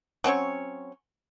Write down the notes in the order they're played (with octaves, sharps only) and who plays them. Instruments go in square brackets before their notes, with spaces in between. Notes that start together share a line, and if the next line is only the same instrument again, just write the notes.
[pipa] F#3 C4 C#4 C#5